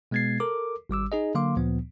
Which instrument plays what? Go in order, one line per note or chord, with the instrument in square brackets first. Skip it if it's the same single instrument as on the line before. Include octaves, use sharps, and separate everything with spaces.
[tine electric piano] B2 G#3 B3 G#6 A6 C7
A4 A#4 D6
G#1 G3 D6 E6
D#4 G#4 D#5
D3 F#3 A#3 F5 C6 D6
D2 A#2 F3 B3